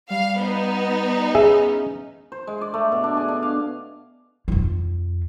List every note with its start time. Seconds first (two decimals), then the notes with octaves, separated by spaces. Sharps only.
0.10 G3 F5
0.39 B3 D#4
1.35 C#4 G#4 E5
2.32 C5
2.47 G#3
2.61 D5
2.74 A3
2.92 B2
3.04 D4
3.17 G#4
3.28 D4
3.42 F5
4.48 F2 F4